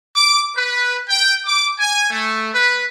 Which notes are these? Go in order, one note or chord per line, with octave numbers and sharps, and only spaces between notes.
D6
B4
G5
D6
G#5
A3
B4